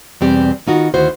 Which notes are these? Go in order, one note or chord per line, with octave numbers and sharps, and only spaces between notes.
E2 B2 G3 C4 G4 D5
D#3 B3 D#4 F4 F#4
D2 D#3 B3 E4 F#4 C5